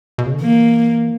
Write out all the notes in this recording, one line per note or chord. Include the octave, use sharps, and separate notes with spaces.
B2
C#3
D3
E3 A#3